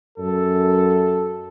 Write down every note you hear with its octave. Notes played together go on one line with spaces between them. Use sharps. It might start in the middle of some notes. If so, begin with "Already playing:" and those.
F#2 A4